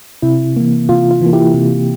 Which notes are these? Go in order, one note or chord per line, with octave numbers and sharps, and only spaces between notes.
C3 E4
E3 A#3
C3 F4
F4
E3 A#3
E4 G4
C3